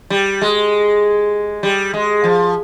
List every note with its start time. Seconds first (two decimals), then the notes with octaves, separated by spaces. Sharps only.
0.10 G3
0.42 G#3
1.63 G3
1.94 G#3
2.24 F3